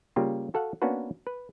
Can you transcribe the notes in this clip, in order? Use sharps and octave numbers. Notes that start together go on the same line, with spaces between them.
C#3 G3 A#3 F4 G4
F#4 A4 F5 F#5
A#3 B3 C#4 D4 F#4 B4
B4